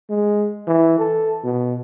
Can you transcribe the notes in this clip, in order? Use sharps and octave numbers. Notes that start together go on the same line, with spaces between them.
G#3
E3
A4
B2